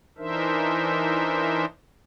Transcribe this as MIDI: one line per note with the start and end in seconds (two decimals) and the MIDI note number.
0.18 1.65 52
0.18 1.65 62
0.18 1.65 63
0.18 1.65 70
0.18 1.65 72
0.18 1.65 76